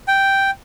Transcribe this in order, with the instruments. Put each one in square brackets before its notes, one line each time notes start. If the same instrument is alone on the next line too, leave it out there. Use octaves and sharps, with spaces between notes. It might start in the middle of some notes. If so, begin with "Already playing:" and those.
[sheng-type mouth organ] G5